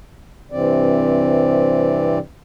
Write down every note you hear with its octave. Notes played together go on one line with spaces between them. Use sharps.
G2 C3 E3 C4 D5